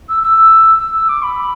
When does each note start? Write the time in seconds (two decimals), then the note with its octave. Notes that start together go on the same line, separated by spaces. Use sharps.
0.08 E6
0.23 E6
0.79 E6
0.94 E6
1.08 D6
1.22 B5